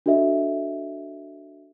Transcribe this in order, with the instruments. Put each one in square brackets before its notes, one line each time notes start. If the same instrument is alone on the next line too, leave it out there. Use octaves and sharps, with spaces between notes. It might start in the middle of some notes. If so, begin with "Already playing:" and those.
[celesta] D4 F#4 A4 D#5 E5